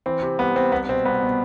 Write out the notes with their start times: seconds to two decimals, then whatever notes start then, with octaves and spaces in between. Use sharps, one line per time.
0.06 E3 C4
0.22 C3
0.39 C2 B3
0.55 C2 C4
0.72 C2 B3
0.89 B2 C4
1.05 C2 B3
1.22 B2